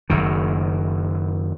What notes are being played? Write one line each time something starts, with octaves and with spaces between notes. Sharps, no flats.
F#1 F#2 D#3